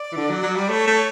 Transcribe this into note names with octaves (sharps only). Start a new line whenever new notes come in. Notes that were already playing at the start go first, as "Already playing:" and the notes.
Already playing: D5
E3
D3
F#3
F#3
G3
A3 C#5
A3